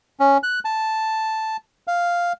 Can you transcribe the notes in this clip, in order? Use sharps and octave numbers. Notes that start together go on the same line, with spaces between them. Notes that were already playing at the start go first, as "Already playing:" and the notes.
C#4
F#6
A5
F5